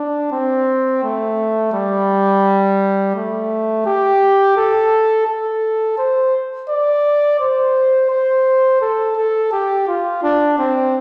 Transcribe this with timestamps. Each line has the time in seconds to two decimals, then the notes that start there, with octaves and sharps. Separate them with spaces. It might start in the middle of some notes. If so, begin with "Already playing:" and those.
Already playing: D4
0.32 C4
1.03 A3
1.73 G3
3.16 A3
3.86 G4
4.57 A4
5.27 A4
5.98 C5
6.69 D5
7.40 C5
8.11 C5
8.82 A4
9.17 A4
9.52 G4
9.88 F4
10.23 D4
10.59 C4